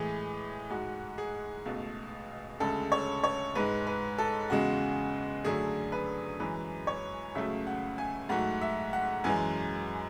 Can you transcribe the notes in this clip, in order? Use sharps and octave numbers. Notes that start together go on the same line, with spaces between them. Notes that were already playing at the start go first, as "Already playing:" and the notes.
Already playing: A2 E3 G#3 G#4
G#2 G#3 F#4
G#4
C#2 B2 A3
D2 C#3 G#3 A4
C#5
C#5
G#2 G#3 B4
B4
A4
E2 C#3 G#3 F#4
F#2 D3 F#3 A3 G#4
B4
F#2 E3 G#3 B4
C#5
C#2 C#3 F#3 A3 E5
F#5
G#5
G#2 F#3 A3 F#5
E5
F#5
F#2 E3 G#3 G#5